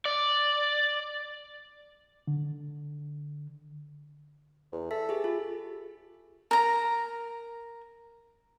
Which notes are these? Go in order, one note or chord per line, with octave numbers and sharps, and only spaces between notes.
D5
D3
E2
A4 E5 B6
G4 G#4
F4
A#4 A#5